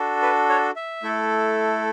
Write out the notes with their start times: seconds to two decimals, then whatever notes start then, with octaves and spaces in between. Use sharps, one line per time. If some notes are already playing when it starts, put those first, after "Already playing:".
Already playing: D4 F#4 A4
0.22 B4
0.49 C#5
0.76 E5
1.03 A3 E4 A4